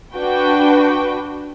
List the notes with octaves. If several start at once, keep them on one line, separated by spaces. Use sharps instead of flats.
D4 F#4 B4 G5